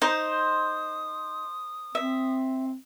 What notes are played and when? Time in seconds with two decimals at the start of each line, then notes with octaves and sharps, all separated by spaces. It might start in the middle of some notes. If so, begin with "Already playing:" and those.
0.02 D#4 C5 D#6
1.95 C4 E5